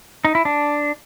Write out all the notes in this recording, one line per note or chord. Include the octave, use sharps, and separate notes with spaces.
D#4
E4
D4